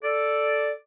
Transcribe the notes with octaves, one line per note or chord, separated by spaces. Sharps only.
A4 D5